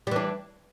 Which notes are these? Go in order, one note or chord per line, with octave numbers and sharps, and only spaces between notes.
E3 G3 D4